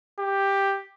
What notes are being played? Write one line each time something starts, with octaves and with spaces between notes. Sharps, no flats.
G4